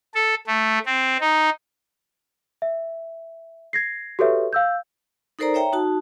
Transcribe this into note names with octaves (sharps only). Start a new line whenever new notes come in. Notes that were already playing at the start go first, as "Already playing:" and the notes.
A4
A3
C4
D#4
E5
G#6 A#6 C7
F#4 G4 A4 B4 C#5 E5
F5 E6 G6
D#4 A4 A#4 C5 D5 A#5
C#5 E5 G5 A#5
D#4 F#4 A5